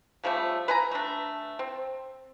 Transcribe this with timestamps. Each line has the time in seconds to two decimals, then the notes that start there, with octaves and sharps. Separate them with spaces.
0.24 C#3 F3 G3 A3
0.68 B4 G#5 A#5
0.91 A3 D4
1.59 C4